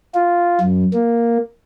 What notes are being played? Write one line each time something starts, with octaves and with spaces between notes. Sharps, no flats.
F4
F#2
A#3